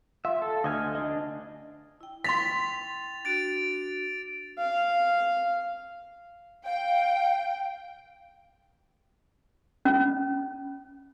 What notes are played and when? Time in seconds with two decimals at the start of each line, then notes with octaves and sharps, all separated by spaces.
0.25 F4 E5
0.42 A4
0.64 D2 D#5 G#5 F6
0.95 D4 D#5
2.01 E4 G5
2.24 C6 A6 B6 F7
3.25 D4 F#4 A6 D7
4.59 F5
6.66 F5 G5
9.85 C#4